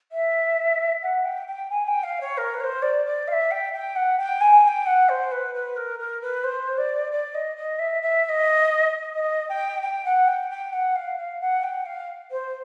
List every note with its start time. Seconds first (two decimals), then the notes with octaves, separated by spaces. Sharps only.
0.12 E5
1.03 F#5
1.25 G5
1.47 G5
1.70 G#5
1.87 G5
2.04 F5
2.21 C#5
2.38 A#4
2.54 B4
2.61 C#5
2.64 C5
2.82 D5
3.06 D5
3.28 F5
3.32 E5
3.51 G5
3.73 G5
3.96 F#5
4.18 G5
4.41 G#5
4.63 G#5
4.68 G5
4.86 F#5
5.09 C5
5.32 B4
5.54 B4
5.77 A#4
5.99 A#4
6.22 B4
6.44 C5
6.78 D5
7.12 D5
7.35 D#5
7.57 D#5
7.79 E5
8.02 E5
8.25 E5
8.29 D#5
9.15 D#5
9.49 G5
9.83 G5
10.05 F#5
10.28 G5
10.51 G5
10.73 F#5
10.96 F5
11.18 F5
11.41 F#5
11.64 G5
11.86 F5
12.31 C5